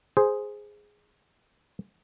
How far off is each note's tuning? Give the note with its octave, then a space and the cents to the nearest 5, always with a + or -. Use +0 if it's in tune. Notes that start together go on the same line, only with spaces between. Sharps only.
G#4 +0 C5 +0